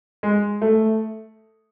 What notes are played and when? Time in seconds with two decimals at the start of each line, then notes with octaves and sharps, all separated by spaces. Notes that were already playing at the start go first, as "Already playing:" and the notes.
0.23 G#3
0.62 A3